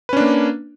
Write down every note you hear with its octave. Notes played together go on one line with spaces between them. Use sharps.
A#3 C#4 D4 B4